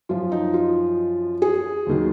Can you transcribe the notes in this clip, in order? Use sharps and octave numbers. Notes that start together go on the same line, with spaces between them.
F#2 F3 F4
D#4
F4
G#4
D#2 D#3 F#3